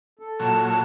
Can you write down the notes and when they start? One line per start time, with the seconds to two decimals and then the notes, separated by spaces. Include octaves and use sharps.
0.19 A4
0.40 A#2 F#3 A5
0.66 A5